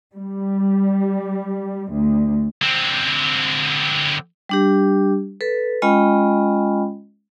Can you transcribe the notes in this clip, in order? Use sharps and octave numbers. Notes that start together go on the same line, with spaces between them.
G3
D2
D3 C4
G3 D4 G4
A4 B4
G#3 C#4 F4 D#5 G5 B5